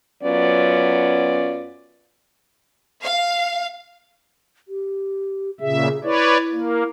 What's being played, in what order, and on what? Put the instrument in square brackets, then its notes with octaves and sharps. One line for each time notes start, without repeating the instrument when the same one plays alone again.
[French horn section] F#2 F#3 B3 C#4 F4 D5
[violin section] F5
[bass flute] G4
[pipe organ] A#2 C#3 E5 [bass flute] G#4
[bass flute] E4 [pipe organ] B4 C#5 D5
[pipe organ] A#3